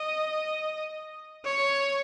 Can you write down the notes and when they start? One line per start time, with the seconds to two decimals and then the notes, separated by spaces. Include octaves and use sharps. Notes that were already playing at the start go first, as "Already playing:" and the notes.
Already playing: D#5
1.45 C#5